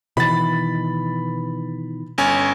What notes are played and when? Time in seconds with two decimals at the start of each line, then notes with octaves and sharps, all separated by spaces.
0.17 B2 D#3 E3 B5 A6
2.18 G1 C#4 G#5